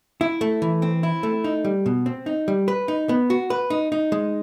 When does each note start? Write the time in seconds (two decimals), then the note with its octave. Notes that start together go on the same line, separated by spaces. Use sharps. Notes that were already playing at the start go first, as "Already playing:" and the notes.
0.21 E4
0.41 A3
0.62 E3
0.82 C4
1.03 E4
1.23 A3
1.44 D#4
1.65 G3
1.86 B2
2.06 C4
2.26 D#4
2.48 G3
2.68 B4
2.88 D#4
3.09 B3
3.30 F#4
3.50 B4
3.70 D#4
3.92 D#4
4.12 G#3